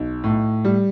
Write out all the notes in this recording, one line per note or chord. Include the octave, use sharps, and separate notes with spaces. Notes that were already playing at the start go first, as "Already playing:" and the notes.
Already playing: B1
A2
G3